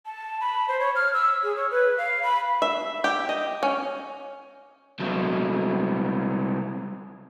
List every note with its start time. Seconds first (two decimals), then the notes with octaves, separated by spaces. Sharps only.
0.06 A5
0.40 B5
0.68 C5
0.80 C#5
0.96 F6
1.14 E6
1.43 G#4
1.56 C#5
1.71 B4
1.98 F5
2.23 B5
2.62 E5
3.04 G4
3.29 D#5
3.63 C#4
5.00 C2 F#3